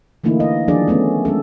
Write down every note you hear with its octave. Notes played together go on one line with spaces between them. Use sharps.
D3 E3 A3 A#3 D#4 E4
D#5
D#3 F3 F#3 D4 G#4 D5
A3 B3 C#4 D4
G#3 C#4 A4